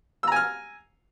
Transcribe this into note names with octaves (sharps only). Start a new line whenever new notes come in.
G#5 A#5 E6 F6